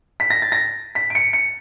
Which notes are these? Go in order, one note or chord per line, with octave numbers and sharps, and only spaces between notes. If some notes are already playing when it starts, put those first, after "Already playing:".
B6
A#6
A6
A#6
B6
D7
C#7
C#7